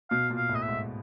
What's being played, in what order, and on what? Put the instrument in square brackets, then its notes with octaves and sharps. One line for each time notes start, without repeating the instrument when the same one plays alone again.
[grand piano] B2 [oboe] F5
[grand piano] A#2
[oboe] F5
[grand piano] A2
[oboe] D#5
E5
[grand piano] G#2